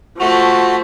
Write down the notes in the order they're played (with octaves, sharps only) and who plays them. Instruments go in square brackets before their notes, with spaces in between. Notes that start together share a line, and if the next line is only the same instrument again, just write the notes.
[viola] F3 [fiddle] A3 [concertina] F#4